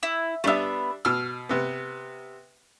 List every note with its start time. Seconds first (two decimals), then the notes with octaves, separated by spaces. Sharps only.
0.03 E4
0.44 G3 A3 B3 D4 E5
1.05 B2 E6 F6
1.49 C3 B3